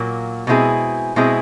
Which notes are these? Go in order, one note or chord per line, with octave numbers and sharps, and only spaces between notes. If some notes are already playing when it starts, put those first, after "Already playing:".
Already playing: A#2 F#3 A#3
B2 G#3 C4 E4 G#4
B2 G#3 C4 E4 G#4